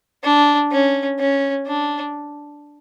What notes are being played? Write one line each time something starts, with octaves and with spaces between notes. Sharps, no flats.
D4
C#4
C#4
D4